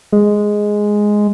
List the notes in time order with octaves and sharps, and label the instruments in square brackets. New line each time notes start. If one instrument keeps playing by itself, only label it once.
[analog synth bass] G#3